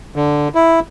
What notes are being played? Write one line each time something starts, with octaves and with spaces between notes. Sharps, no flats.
D3
E4